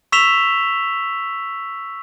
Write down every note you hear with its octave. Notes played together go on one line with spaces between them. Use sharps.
C#6 E6 B6 E7 F7 G7